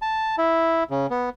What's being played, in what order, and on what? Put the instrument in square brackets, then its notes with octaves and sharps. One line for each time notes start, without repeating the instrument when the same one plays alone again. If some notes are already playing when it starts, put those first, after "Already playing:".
[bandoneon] A5
E4
C#3
B3